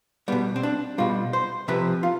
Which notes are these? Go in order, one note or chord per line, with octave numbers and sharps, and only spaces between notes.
B2 G3 B3
C4
D4
B2 G3 F4
C5
C3 F3 B4
F4